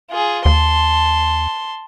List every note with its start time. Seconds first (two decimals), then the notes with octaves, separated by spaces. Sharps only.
0.10 F4 G#4
0.45 D#2 A5 C6